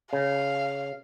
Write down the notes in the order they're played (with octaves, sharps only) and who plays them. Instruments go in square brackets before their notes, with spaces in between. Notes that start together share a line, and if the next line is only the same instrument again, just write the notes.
[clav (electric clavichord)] C#3 [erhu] F5